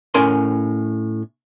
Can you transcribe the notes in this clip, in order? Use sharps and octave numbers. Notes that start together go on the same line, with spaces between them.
A2 C#4 A#4 G#5 C6